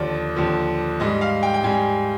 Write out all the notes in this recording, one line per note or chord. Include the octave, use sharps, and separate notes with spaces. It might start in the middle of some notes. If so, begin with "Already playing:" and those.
Already playing: D#2 D3 F3 D5
D#2 D3 F3
G#2 G3 D#5
F5
G5
G5
G#2 G3 G#5